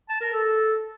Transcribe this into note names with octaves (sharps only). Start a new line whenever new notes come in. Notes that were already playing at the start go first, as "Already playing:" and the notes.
A5
A#4
A4